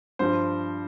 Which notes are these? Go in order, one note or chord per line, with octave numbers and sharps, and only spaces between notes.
G2 F3 C5